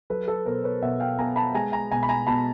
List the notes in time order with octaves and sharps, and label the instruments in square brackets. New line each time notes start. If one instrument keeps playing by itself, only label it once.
[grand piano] F#3 A4 B4
A4 B4
B2 A#4 C5
B4 C#5
B2 E5 F#5
F5 G5
B3 G#5 A#5
A5 B5
G#3 G#5 A#5
G#5 A#5
B2 G#5 A#5
B5
G#5 A#5
B2 A5 B5